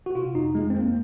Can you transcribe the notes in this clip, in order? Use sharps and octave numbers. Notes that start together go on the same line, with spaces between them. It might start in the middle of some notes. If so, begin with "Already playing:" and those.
F#4
C3 F4
F2 D#4
F2 G#3
C4
F2 A#3